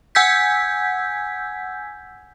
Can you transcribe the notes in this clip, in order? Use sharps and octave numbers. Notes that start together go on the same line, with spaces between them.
F#5 G#5 E6 G6 G#6 B6